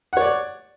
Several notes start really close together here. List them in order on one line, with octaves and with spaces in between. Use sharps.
F#5 C#5 D5